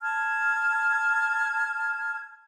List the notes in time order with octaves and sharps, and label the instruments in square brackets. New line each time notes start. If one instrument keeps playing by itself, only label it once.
[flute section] A5 F6 G#6